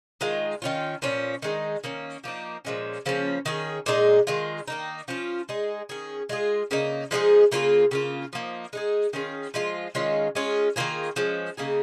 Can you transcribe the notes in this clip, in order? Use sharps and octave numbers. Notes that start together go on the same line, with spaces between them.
D#3 G#3 F4
D#3 C#4 F4
A#2 F3 C#4
D#3 G#3 D#4
D#3 A#3 C#4
F3 A#3 D#4
A#2 F3 G#3 C#4
C#3 F3 A#3 C#4
D#3 C#4 G#4
A#2 G#3 D#4 G#4
D#3 G#3 F4
D#3 A#3 D#4
F3 C#4 F4
G#3 D#4 G#4
D#3 C#4 G#4
G#3 F4 G#4
C#3 A#3 D#4
F3 G#3 D#4 G#4
C#3 A#3 F4 G#4
C#3 A#3 F4
F3 A#3 D#4
G#3 D#4 G#4
D#3 C#4 F4 G#4
F3 G#3 F4
D#3 G#3 C#4 F4
G#3 C#4 F4 G#4
D#3 A#3 F4 G#4
F3 G#3 C#4
C#3 A#3 D#4 G#4